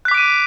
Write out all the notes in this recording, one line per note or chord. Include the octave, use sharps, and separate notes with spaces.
D6 F#6 B6 D7 D#7